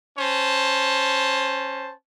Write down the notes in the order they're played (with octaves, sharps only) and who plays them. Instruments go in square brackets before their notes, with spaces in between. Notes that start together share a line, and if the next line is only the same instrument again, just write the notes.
[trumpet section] C#4 C5 A5